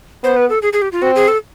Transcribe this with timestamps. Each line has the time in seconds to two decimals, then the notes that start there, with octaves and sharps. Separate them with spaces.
0.23 B3 C5
0.37 B4
0.50 A4
0.62 G#4
0.73 G#4
0.82 G4
0.92 F4
1.02 C4 F#4
1.16 G#4
1.28 A4